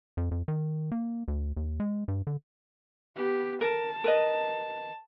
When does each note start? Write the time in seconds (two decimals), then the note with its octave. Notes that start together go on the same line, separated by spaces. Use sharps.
0.17 F2
0.31 F2
0.48 D#3
0.92 A#3
1.28 D2
1.57 D#2
1.80 G#3
2.08 G2
2.27 D3
3.16 B3 G4
3.61 A#4 A5
4.04 A#4 B4 D#5